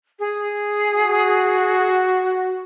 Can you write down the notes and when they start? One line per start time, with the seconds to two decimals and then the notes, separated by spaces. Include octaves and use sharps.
0.19 G#4
0.93 F#4